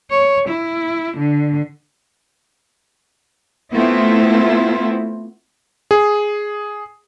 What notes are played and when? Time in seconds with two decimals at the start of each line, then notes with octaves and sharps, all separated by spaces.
0.10 C#5
0.49 E4
1.18 D3
3.74 A3 B3 C4 E4 F4
5.91 G#4